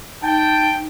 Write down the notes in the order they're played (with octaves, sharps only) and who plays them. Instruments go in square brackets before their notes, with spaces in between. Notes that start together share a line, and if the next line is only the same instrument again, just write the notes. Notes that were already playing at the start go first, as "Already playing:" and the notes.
[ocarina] D#4 [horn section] G5 [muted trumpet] A5